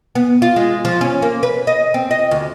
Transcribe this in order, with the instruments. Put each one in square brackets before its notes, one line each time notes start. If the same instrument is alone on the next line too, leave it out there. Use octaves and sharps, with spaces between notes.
[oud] B3
F4
G#3
F3
C#4
A#3
B4
D#5
C4
D#5
D2